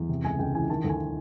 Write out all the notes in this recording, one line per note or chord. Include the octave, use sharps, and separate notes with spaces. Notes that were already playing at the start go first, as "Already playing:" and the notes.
Already playing: E2
C3
C#2 G#5
C#2 G5
E3 G#5
D#3 A5
D2
G#5